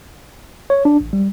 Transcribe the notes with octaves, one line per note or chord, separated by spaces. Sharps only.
C#5
D4
A1
G3